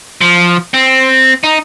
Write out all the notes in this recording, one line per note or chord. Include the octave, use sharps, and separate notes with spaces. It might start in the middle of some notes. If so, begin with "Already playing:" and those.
F3
C4
D#4